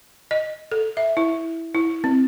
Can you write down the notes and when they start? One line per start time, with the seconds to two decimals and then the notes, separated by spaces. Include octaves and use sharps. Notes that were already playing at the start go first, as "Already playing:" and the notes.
0.31 D#5
0.72 A4
0.97 E5
1.17 E4
1.75 E4
2.04 C4